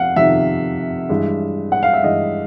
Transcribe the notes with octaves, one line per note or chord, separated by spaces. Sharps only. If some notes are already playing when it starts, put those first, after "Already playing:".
Already playing: F2 C3 F5 F#5
F2 C3 D#3 E5
G2 E3 G#3
F#5
F5
E5
G2 E3 G#3 D#5